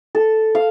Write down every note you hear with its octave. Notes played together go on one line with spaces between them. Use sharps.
A4
F5